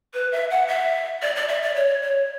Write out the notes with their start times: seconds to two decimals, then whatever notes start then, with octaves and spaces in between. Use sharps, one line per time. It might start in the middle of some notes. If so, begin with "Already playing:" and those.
0.14 B4
0.32 E5
0.51 F#5
0.68 E5
1.22 D5
1.36 D5
1.48 E5
1.63 D5
1.76 C#5
2.02 C#5